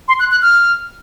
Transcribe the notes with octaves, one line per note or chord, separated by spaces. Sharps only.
C6
F#6
F#6
F6